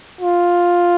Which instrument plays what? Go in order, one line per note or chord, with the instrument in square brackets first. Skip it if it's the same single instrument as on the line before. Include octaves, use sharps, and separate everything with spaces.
[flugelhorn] F4